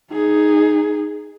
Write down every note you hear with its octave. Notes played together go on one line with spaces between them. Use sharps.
D#4 G#4